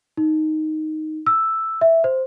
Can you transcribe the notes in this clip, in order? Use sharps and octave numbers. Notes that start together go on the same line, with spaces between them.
D#4
E6
E5
C5